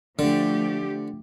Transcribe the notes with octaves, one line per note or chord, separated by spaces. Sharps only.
D3 F3 A3 G4